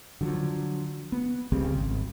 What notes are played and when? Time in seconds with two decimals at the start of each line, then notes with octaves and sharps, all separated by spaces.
0.21 D3 F3 F#3
1.12 B3
1.52 C#2 C#3 G3 C4
1.76 G#1